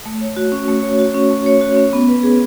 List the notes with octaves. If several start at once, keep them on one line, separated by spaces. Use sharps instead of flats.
A3
C#5
F#4
C#4
A3
C#5
F#4
C#4
A3
C#5
F#4
C#4
B3
B4
G#4